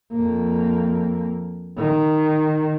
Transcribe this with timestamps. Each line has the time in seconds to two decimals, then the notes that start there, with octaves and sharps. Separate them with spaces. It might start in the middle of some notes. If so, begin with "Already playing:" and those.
0.13 F2 A#3
1.78 D#3